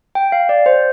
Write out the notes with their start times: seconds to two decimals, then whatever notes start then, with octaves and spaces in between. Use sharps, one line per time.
0.15 G5
0.32 F5
0.49 D5
0.66 C5